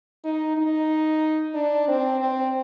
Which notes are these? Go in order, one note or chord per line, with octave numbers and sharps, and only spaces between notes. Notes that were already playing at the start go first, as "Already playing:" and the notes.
D#4
D#4
D4
C4
C4